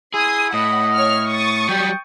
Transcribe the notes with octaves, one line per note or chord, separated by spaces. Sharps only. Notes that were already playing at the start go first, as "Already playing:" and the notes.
E4 G#4 C6 D#6
A2 D#5 F#5 B5
C#5 F6
C#6 D#6 A6
F#3 G3 G5